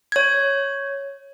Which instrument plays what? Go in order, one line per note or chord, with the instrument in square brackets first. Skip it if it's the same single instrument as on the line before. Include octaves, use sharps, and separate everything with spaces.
[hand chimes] C#5 G#6